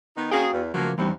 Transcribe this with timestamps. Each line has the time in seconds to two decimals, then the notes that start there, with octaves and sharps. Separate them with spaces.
0.16 D#3 B3 D#4
0.31 A#3 C#4 F#4 G#4 F5 G5
0.53 E2
0.74 C#3 F3 F#3 A3 A#3
0.98 D#2 E3 G3 B3 C4